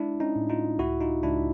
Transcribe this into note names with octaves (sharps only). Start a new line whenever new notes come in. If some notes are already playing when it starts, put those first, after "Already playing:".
Already playing: G#3 D4 E4
C#4 D#4
A2
D#4 F4
C#2 E4 F#4
D#4 F4
C#2 D4 E4